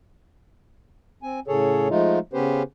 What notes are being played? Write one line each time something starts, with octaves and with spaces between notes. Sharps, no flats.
C4 G#5
A2 C#3 G#4 A4 C#5
F3 G#3 A3 D#4 F4
C#3 B3 C#4 G4 B4 C5